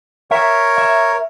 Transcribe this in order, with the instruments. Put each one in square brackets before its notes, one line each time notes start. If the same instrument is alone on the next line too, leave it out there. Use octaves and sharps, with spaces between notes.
[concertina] A#4 C#5 [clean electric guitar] E5
[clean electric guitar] E5